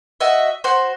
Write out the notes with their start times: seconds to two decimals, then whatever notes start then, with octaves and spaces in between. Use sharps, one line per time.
0.20 F#4 D#5 E5
0.64 F#4 C5